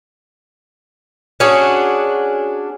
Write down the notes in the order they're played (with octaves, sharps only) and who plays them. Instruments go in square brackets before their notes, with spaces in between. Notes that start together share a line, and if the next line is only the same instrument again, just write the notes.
[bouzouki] C#4 D4 F#4 G#4